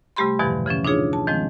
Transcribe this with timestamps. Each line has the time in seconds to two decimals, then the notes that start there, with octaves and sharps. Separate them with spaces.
0.16 C3 G3 A3 G4 B5 C6
0.39 E2 G2 B2 D3 E3 F3
0.66 C#3 E3 F3 C#4
0.85 D4 D#4 F4 G#4 C#5
1.13 A5
1.27 D#3 F3 G#3 C4